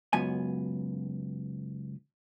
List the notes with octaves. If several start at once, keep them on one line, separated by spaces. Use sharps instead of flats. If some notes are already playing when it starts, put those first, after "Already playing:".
C#2 F#2 B3 G#5